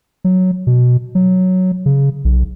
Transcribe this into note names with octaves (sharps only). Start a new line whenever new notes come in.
F#3
B2
F#3
C#3
B1